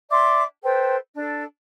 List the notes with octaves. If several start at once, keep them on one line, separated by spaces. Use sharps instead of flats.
D5 E5 C6 D6
A4 B4 C5 G5
D4 A4